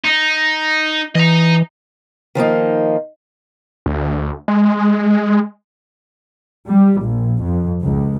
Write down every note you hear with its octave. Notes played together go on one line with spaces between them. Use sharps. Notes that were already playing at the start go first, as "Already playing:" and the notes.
D#4
E3 D#5 A#5
D#3 F3 A#3 D#4
D2
G#3
G3
A#1
F2
C#2